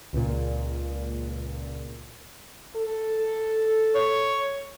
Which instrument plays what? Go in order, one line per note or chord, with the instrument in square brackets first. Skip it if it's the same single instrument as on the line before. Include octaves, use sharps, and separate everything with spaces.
[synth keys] C#2 A#2
[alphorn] A4
[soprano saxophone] C#5